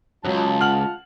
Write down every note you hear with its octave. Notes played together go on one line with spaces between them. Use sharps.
C#2 F#2 F#3 F4 A5
F#5 F6 F#7